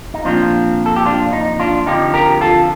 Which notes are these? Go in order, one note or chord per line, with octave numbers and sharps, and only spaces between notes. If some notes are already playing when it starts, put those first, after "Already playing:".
D#4
A#2 F3 C4 D4 F4
A4
G4
D4 F4
D#4
D4 F4
F2 D3 F3 D#4 G4
G4 A#4
F4 A4